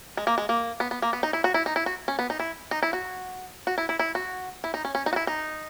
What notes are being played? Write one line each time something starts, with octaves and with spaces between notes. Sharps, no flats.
G#3
A#3
G#3
A#3
B3
B3
A#3
B3
D#4
E4
F#4
E4
D#4
E4
F#4
C#4
B3
D#4
E4
D#4
E4
F#4
F#4
E4
E4
E4
F#4
E4
D#4
C#4
C#4
D#4
F#4
E4
D#4